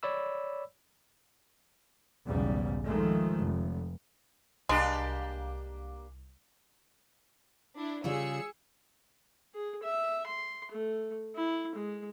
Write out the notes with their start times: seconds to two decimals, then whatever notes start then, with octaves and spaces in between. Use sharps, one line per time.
0.03 C#5 D5 B5 E6
2.25 B1 E2 G#2 C#3 G3
2.86 D#3 F3 G#3 A3
3.39 F1
4.69 C2 G#3 A#3 D4 G4
7.75 D4 E4
8.04 C#3 G3 F4 G#4 E6 C#7
9.55 G#4
9.83 E5
10.27 C6
10.72 A3
11.35 E4
11.76 G#3